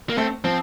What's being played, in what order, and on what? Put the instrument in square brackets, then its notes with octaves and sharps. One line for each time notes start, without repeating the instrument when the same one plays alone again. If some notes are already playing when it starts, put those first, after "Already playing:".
[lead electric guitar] A#3
[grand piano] A3 [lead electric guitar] C4
[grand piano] F3 [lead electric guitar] C4